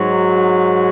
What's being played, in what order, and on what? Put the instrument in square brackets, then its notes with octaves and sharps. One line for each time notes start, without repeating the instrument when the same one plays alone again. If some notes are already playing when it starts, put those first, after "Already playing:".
Already playing: [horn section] G#2 F#3